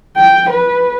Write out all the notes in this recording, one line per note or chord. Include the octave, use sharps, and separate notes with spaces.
G5
B4